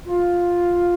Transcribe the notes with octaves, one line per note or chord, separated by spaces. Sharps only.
F4